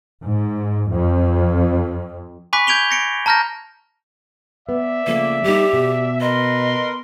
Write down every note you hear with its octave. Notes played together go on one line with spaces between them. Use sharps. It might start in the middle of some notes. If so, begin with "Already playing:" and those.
G#2
F2
G#5 B5 C#6 D6 F#6 B6
G6 G#6 D7 F7 G7
A#6 C#7 D7
A5 A#5 F6 G6 A#6
B3 D5 E5
C#3 F3 A3 A#3
G3 A#3 D#4 G4
B2
A#4 B4 D#5 C6